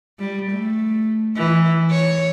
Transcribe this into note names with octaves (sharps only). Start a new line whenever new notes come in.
G3
A3
E3
C#5